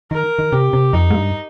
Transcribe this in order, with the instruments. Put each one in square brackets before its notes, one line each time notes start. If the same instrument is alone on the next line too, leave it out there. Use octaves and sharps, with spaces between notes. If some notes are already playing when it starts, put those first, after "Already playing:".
[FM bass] D#3 [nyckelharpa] A#4
[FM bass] D#3
[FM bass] C3 [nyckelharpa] G4
[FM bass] C3
[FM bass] F2 [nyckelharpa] D#4
[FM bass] G#2
G2